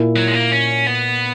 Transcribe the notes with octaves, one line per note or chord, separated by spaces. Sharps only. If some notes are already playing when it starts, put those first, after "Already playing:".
Already playing: A#2 A#3 E4
F#3
G#3
A#3
C#4
B3